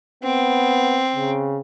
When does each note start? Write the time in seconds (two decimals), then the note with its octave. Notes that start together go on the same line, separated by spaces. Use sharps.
0.23 B3 C4
1.16 C#3